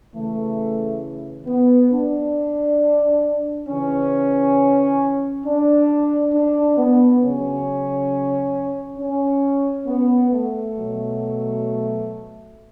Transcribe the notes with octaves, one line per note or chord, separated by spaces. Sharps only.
C#3 E3 A3
B3
D4
C#3 E3 C#4
D4
D4
B3
C#3 F#3 C#4
C#4
B3
A3
B2 F#3